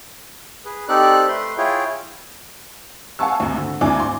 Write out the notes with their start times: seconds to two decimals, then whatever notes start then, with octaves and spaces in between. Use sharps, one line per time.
0.65 G#4 B4
0.88 C4 D#4 G4 A4 D5 F#6
1.28 A3 B4 C6
1.58 E4 F4 G#4 C#5 G5
3.19 F5 F#5 G#5 A5 C#6 E6
3.40 G#1 D2
3.58 D3
3.81 G#1 D2 D4 E4 G#5 D6
4.00 C6